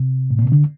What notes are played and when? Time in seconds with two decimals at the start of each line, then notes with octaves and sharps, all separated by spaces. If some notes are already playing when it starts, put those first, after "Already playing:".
Already playing: C3
0.31 A2
0.39 A#2
0.45 C3
0.52 D3